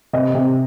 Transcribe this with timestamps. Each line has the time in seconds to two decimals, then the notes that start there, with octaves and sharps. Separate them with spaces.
0.13 C3 D#5
0.35 C3